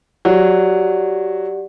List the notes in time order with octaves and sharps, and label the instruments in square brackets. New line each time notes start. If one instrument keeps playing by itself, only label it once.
[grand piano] F#3 [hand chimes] G4 D5 F#5